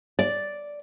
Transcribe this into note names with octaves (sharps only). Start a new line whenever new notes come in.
D5